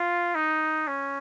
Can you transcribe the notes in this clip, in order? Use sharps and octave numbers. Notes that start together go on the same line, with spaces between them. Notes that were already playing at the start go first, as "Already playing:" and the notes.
Already playing: F4
D#4
C#4